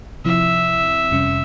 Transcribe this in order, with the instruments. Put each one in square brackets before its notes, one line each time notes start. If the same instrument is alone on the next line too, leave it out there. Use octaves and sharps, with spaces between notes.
[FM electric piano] C3 F3 C4 E4 [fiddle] E5
[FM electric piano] F2 C3 G3 C#4